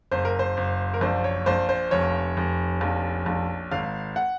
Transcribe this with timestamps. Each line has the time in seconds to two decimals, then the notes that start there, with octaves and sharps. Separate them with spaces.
0.12 F#1 C5
0.25 A#4
0.39 C5
0.57 F#1
0.94 A#4
1.01 A#1 C5
1.24 C#5
1.46 A#1 C5
1.69 C5
1.91 F1 C#5
2.37 F1
2.81 A#1
3.26 A#1
3.71 G#1 F5
4.16 F#5